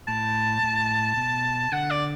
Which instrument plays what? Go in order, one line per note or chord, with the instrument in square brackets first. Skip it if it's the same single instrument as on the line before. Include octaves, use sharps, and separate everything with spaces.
[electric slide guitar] A2 [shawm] A5
[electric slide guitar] A2
B2
[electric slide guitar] D3 [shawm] F#5
[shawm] D5